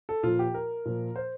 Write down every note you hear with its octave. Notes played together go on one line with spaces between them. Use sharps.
A4
A#2 F3 F4
G4
A#4
A#2 F3
C5